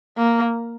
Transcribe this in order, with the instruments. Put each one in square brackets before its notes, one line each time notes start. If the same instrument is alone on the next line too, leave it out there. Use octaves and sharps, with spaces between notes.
[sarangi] A#3